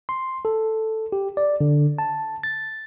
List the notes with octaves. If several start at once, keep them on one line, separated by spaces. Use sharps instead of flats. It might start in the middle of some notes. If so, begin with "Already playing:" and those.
C6
A4
G4
D5
D3
A5
A6